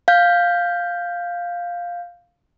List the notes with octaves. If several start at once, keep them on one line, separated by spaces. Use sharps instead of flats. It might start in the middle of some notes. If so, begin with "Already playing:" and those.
F5 G6